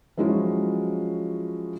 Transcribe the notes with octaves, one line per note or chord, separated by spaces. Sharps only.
F3 F#3 G#3 C#4 E4 F4